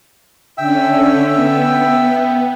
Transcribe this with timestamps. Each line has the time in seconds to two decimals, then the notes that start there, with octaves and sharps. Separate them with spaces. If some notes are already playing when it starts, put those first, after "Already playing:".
0.58 D3 C#4 E5 G5 E6
1.34 B3